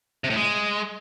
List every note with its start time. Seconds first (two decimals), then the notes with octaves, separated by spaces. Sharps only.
0.24 C3
0.30 A2
0.36 G#3